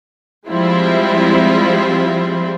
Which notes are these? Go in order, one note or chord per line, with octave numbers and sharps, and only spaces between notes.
F3 G3 G#3 C4 E4 F4